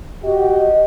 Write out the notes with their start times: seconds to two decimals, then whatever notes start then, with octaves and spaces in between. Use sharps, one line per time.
0.24 F#4 G4 D#5